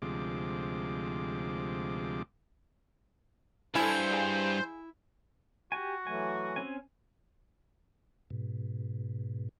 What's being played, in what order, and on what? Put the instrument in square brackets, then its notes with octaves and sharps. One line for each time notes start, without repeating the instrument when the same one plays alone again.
[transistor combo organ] D2 C3 F3 G#3 D6
[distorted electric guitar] C#2 G2 [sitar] E4 [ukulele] A4 G#5 [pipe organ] C5
[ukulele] G#4 F5 G#5
[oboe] F#4 [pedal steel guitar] G4 G#5
[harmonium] E3 F#3 A3 [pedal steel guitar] G#5
[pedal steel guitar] C4 C#4 G#5
[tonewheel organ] G#2 B2